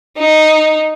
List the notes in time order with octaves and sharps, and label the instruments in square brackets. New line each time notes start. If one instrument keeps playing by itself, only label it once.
[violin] D#4